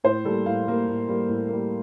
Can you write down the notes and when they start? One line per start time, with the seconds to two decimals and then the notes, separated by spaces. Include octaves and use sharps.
0.04 A2 C5
0.25 G3 A#3 A4
0.46 A2 F5
0.66 G3 A#3
0.88 A2
1.08 G3 A#3
1.29 A2
1.49 G3 A#3